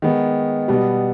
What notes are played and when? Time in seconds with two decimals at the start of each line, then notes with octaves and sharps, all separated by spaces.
0.02 D#3 G#3 B3
0.68 B2 G3 B3